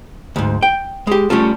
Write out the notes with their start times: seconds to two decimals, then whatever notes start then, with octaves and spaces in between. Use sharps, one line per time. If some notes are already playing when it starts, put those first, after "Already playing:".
0.36 D2 G#2
0.62 G5
1.07 G#3 G4
1.30 G3 A3 C#4 F4 A4